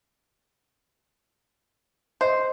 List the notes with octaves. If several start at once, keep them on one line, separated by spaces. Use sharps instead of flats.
C5 D#5 C6